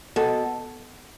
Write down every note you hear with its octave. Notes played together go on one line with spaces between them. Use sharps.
B2 A4